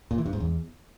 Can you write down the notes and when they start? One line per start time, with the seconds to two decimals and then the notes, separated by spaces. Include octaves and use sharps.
0.11 A#2
0.18 E3
0.26 G2
0.33 G#2
0.40 E2